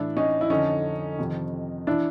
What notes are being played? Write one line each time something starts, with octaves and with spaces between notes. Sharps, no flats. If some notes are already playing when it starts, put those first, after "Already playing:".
Already playing: A2 E3 D4 E4
C#4 D#4
E4
F2 D3 C#4 D#4
F2 C3 D#3
E3 D4 E4